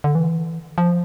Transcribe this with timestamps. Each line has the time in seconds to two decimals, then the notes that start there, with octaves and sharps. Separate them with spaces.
0.04 D3
0.15 E3
0.78 F3